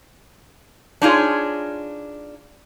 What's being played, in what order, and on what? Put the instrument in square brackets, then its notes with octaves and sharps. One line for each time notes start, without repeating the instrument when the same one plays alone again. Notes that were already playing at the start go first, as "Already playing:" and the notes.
[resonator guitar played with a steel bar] D4 D#4 F4 G#4 C#5